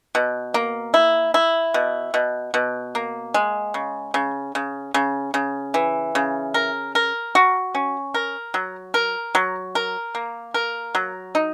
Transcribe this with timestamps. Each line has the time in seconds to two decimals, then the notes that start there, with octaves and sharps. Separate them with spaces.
0.15 B2
0.54 A#3
0.94 E4
1.34 E4
1.74 B2
2.14 B2
2.54 B2
2.95 A#3
3.34 G#3
3.74 C#3
4.14 C#3
4.55 C#3
4.94 C#3
5.34 C#3
5.74 E3
6.15 C#3
6.54 A#4
6.95 A#4
7.35 F#4
7.75 C#4
8.14 A#4
8.54 F#3
8.94 A#4
9.35 F#3
9.75 A#4
10.15 A#3
10.54 A#4
10.95 F#3
11.35 D#4